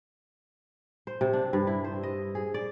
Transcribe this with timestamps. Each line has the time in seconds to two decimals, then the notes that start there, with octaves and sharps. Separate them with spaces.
1.07 C5
1.21 C3
1.33 D4
1.53 G2
1.67 E4
1.84 C5
2.03 D#5
2.35 G#4
2.54 D5